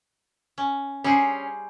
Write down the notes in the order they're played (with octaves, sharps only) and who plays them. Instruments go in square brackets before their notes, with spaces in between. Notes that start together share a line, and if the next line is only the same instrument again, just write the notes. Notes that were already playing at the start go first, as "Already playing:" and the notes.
[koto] C#4
[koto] G3 G#4 C5 [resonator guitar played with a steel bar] C#4